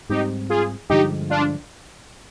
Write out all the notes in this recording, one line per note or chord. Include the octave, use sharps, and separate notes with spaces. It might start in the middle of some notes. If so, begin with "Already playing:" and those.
G#2 G3 C4 D#4 G4
F4 G#4
G2 D3 F3 G#3 D#4 G4
D4 F4